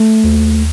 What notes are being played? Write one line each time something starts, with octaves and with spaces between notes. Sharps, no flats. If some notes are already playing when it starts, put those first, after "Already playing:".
Already playing: A3
D#2